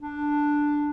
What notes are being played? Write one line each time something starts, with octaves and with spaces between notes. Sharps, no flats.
D4